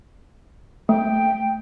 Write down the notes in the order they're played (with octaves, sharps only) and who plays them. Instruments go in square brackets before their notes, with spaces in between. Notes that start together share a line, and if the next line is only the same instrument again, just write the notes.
[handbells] A3 [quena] G5